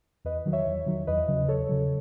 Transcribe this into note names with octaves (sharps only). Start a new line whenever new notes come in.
E2 B4 D#5
D#3 F#3
C#5 E5
E2
D#3 F#3
E2 B4 D#5
C#3 F#3
E2 A4 C#5
C#3 F#3